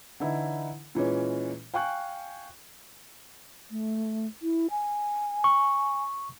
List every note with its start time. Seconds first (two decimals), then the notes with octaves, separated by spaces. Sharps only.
0.20 D3 E3 D#4 E4
0.95 A#2 E3 G#3 C#4
1.74 F5 G5 G#5 C#6 F#6
3.71 A3
4.42 E4
4.71 G#5
5.44 C#6